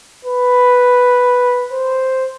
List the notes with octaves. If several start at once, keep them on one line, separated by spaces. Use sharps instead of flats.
B4
C5